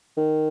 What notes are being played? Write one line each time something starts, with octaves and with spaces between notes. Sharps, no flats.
D#3